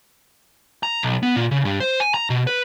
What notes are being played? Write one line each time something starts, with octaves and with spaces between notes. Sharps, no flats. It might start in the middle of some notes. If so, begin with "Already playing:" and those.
A#5
B1
B3
A#2
C#3
G2
C5
G#5
A#5
B2
B4